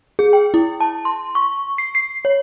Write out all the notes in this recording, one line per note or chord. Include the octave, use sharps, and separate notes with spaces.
G#4
G5
E4
A5
C6
C#6
C7
C7
C#5